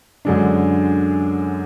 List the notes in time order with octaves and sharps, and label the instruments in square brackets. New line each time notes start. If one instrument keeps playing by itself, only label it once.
[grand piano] F#2 D3 G#3 D4